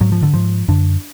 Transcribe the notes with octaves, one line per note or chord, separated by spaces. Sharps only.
G#2 F#3
F3
D3
G#2 F3
F#2 D3 D4